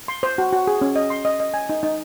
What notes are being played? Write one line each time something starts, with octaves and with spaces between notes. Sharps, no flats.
C6
C5
F#4
F#4
G#4
C#4
D#5
C6
D#5
D#5
G#5
D#4
D#4